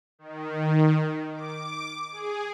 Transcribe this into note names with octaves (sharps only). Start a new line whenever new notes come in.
D#3
D6
G#4